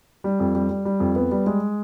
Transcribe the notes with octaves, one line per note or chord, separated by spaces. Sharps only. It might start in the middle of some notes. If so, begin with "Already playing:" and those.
G3
F2
G3
G3
G3
F2
B3
G3
G#3